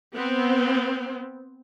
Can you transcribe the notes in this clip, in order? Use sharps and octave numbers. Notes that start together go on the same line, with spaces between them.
B3 C4